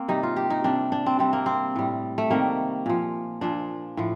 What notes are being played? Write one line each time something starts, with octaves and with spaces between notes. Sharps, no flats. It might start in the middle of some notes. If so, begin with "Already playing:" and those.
Already playing: A#3 C4
C3 G3 D#4
F4
G4
D#4
C3 G3 D4
D4
C4
C3 G3 C4
A#3
C4
A2 G3
A3
C3 D#3 G3 A#3
A#2 F3
A#2 F3 D4
A2 F3